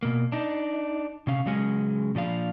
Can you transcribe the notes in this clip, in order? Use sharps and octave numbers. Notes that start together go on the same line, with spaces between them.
B2 A#3
D4 D#4
C3 C#4 F5
C#3 F#3 G#3 C#4 G#4
A#2 F3 D4 F5